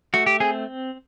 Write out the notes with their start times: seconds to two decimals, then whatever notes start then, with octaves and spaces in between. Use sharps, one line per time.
0.14 A3 F#4
0.26 G4
0.40 C4 G#4